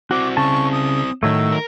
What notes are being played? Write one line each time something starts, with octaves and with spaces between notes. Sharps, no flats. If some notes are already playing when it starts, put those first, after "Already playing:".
C4 E4 F#4 D6
C#3 A5 C#6
D#6
A2 D#3 F#3 A3 E6
A#4